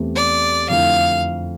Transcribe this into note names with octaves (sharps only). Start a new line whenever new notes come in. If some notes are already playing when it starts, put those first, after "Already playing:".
Already playing: E2 E3 A3 C4 G4
D5
F2 D3 A3 E4 F5